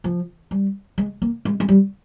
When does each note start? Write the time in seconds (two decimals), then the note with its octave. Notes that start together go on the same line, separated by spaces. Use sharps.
0.04 F3
0.51 G3
0.98 G#3
1.22 A#3
1.45 G#3
1.60 G#3
1.68 G3